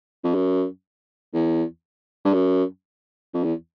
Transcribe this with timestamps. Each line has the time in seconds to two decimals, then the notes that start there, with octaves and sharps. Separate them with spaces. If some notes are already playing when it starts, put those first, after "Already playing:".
0.24 F2
0.34 F#2
1.34 E2
2.25 G2
2.33 F#2
3.34 F2
3.44 E2